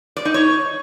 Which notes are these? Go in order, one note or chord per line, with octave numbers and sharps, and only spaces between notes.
D5
D#4
C#5